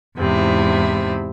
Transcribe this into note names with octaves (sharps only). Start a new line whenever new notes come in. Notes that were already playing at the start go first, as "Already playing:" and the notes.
E2 G#2 C3 E4